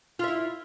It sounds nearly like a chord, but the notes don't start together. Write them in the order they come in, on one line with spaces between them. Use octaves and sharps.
F4 E5 E4